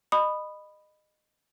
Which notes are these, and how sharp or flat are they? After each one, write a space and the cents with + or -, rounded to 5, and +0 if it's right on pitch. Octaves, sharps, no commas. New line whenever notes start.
D#5 -25 B5 +5 D#6 -20